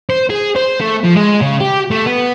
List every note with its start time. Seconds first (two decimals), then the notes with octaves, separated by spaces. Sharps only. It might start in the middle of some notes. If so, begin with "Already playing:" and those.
0.10 C5
0.30 G#4
0.56 C5
0.81 A3
1.04 F3
1.15 G#3
1.41 C#3
1.60 G4
1.91 A3
2.06 B3